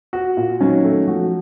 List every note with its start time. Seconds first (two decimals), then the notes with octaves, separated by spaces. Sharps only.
0.13 F#4
0.37 A#2
0.60 D#3 F#3 C#4
0.85 A3
1.07 F3 F#4